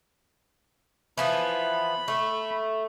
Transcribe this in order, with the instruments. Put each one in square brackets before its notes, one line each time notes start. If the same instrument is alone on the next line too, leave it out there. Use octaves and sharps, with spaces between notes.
[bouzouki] E3 F3 B3 [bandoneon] B5
[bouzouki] A3